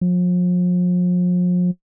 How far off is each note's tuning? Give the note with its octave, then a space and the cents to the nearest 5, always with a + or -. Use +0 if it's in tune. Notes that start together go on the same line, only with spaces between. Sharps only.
F3 +40